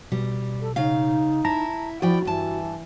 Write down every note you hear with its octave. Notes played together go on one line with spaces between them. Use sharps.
B2 G3
A4
C#3 D#4 F5
E4 A5 A#5 A#6
F3 E4 F#4 D5 G5
G2 E3 A5